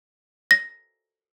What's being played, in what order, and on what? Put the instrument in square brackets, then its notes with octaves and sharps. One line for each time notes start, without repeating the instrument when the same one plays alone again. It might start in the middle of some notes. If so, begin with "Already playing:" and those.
[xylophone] A#6